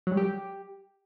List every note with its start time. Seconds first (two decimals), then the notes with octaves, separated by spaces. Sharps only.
0.07 F#3
0.12 G3
0.17 G4